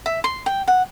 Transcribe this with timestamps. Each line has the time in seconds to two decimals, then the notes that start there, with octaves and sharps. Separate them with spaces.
0.06 E5
0.24 C6
0.46 G5
0.68 F#5